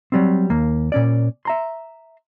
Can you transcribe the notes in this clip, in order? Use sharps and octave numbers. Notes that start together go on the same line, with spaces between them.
F#3 G3 C4
D#2 A#3
A#2 C#4 D5
E5 A#5 C6